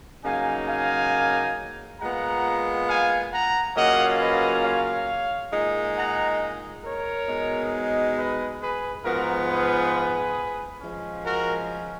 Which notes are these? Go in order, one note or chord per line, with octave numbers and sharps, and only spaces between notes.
C#3 F#3 A#3 D#4 F5 G#5
F5 G#5
A#2 G#3 B3 F4 F#5 A#5
F5 G#5
F#5 A#5
C#3 F#3 A#3 C#4 F4 D#5 F#5
B4 D#5
C#5 F5
A#2 G#3 D#4
F#5 A#5
A#4 C#5
B2 G#3 D#4
B4 D#5
G#4 B4
G#2 F3 B3 F4 F#4 A#4
G#4 B4
F3 G#3 C#4
F#4 A#4